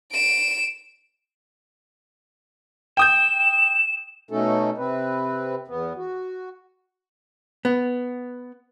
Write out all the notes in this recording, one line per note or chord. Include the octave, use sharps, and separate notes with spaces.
D7 E7
G5 D#6 G6 E7
B2 A3 C#4 D#4 A4
C3 C4 B4
E2 B3
F#4
B3